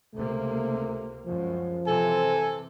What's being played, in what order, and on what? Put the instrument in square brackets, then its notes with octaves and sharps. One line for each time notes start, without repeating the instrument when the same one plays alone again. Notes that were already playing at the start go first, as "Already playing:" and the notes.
[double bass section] C#2 C3 A#3 [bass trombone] A3
[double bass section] F#2 G#3 [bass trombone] F3
[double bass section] C3 E3 C4 [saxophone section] A4 [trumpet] G#5